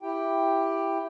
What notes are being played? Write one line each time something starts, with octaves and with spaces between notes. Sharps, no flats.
E4 G4 G5